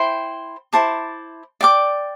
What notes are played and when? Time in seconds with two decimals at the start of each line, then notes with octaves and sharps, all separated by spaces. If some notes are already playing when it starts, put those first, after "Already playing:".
Already playing: E4 C5 G5 C6
0.73 E4 C5 A5 D6
1.61 D5 G5 D6